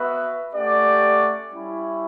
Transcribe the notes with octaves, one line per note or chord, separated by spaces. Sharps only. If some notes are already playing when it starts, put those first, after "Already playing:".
Already playing: B3 F#4 B4 E5
A3 C#4 G4 D5 F#5
G3 C#4 E4